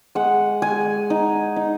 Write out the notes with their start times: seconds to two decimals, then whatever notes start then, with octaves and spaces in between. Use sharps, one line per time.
0.15 G#3 F#5
0.62 G#3 G#5
1.10 D#4
1.56 D#4